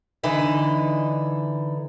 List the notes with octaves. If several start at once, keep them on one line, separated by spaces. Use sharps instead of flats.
D3 E3 D#4 E5